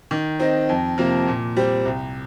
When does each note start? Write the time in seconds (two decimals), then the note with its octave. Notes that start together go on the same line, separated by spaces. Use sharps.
0.11 D#3
0.40 C4 D#4
0.69 F2
0.98 C3 F3 A#3
1.28 A#2
1.56 G3 C4
1.85 C2